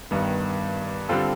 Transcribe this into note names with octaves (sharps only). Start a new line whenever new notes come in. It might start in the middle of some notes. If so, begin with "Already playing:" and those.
G2 D#3 G3 B3
D3 G3 C4 F4 A4